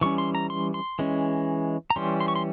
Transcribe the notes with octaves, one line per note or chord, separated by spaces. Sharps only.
E3 G3 C#4 C#6
C6
A#5
C6
C6
E3 G#3 C#4
A#5
E3 G3 C#4 C6
C6
C#6
C6